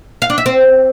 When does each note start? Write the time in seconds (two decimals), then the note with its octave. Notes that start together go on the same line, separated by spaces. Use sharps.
0.22 F5
0.30 D4
0.38 E5
0.46 C4